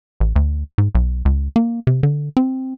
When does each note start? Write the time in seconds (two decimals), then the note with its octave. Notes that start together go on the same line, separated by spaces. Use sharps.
0.20 A1
0.36 D2
0.78 G#2
0.95 B1
1.25 C#2
1.56 A#3
1.87 C3
2.03 D3
2.37 C4